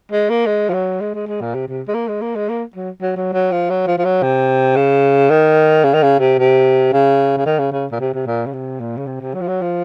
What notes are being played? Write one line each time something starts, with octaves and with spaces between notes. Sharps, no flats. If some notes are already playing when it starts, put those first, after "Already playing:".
G#3
A#3
G#3
F3
F#3
G#3
G#3
G#3
A#2
C3
C3
G#3
A#3
G#3
A#3
G#3
A#3
F#3
F#3
F#3
F#3
F3
F#3
F3
F3
F#3
C3
C#3
D#3
C#3
D#3
C#3
C3
C3
C#3
C#3
D#3
C#3
C#3
A#2
C3
C3
A#2
C#3
C3
A#2
C#3
C3
C3
F#3
F3
F#3
F3